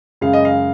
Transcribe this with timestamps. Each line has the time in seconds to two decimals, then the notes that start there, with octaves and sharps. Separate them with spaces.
0.21 F#2 C#3 G#3 F5
0.33 D#5
0.45 F5